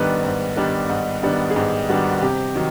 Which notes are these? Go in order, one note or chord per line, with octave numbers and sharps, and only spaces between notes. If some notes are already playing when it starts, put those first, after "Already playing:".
Already playing: G#2 D#3 G3 B3 D4 A4 B4
G#2
D#3 G3 B3 D4
G#2
D#3 G3 B3 D4
G#4
G#2 G4
D#3 G3 B3 D4 F#4
C3 G4
D#3 F#3